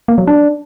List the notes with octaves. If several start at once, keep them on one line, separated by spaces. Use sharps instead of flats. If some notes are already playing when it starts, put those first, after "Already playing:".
A#3
F#3
D4